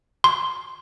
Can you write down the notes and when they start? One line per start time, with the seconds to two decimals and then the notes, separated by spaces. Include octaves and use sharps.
0.24 C6